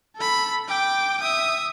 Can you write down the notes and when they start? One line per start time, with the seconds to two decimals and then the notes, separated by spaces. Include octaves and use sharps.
0.16 A4 B5
0.68 G5 D6
1.21 E5 D#6